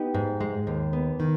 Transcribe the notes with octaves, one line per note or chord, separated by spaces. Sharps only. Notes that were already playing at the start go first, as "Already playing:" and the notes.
Already playing: B3 D#4 G4
G#2
G#3
D#2
B3
D#3